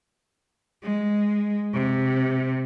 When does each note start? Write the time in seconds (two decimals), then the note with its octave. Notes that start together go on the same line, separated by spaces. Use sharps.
0.84 G#3
1.75 C3